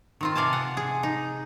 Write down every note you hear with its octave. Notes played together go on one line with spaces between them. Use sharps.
D#3 C4 F4
C3 D5 F5 G#5 A5
F#5
G#4
D#4